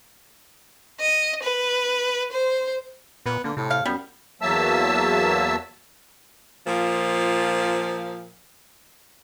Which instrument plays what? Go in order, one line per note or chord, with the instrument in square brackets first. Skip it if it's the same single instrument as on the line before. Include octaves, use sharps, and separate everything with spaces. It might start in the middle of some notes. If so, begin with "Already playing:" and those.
[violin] D#5
B4
C5
[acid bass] A#2 [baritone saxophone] B3
[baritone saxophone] D3 [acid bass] A#3
[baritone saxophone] A2 [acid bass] C3
[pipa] F5
[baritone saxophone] F#2 [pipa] G3 [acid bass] B3
[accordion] E2 F#3 A#3 E5 A5 E6
[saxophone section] A#2 F3